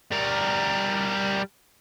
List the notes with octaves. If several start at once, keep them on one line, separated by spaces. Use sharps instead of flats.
G3 A#4